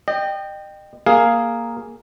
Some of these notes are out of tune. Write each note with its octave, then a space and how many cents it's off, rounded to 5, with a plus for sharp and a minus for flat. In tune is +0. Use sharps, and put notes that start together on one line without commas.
D#5 -35 G5 +0
A#3 +0 G#4 +0 F5 +0